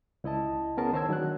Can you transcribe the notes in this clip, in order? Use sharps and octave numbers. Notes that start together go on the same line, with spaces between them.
C#2 E4 D#5 A5
B3 C#4 G#4 A#4 A5
D#3 C5 C#5 A5 E6 G#6
D#3 F#3 D4 F#5 F#6